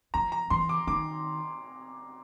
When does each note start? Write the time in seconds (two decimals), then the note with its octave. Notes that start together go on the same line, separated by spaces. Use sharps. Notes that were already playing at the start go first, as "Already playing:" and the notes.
0.14 F3 A#5
0.32 A#5
0.50 E3 C6
0.69 D6
0.87 D#3 D6